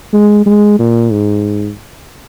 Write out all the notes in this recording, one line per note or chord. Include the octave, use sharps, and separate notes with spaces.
G#3
G#3
A#2
G#2